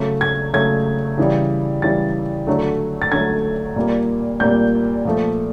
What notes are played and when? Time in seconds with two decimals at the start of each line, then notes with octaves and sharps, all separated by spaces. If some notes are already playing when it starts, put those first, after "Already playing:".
Already playing: C#3 F#3 A3
0.21 G#6
0.53 C#3 F#3 A3 G#6
1.18 C#3 E3 G3
1.82 C#3 E3 G3 A6
2.47 D3 F#3 A3
3.02 A6
3.12 D3 F#3 A3 G#6
3.76 A#2 G3 A#3
4.40 A#2 G3 A#3 G6
5.05 A#2 F3 A3